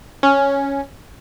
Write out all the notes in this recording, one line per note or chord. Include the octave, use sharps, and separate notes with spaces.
C#4